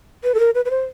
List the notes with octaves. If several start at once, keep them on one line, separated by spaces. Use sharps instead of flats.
B4
A4
A#4
B4
B4
C5